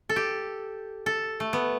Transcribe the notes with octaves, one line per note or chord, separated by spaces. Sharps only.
A4
G4
A4
A3
B3